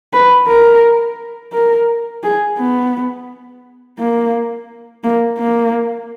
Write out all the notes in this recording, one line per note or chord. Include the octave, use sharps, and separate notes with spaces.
B4
A#4
A#4
G#4
B3
A#3
A#3
A#3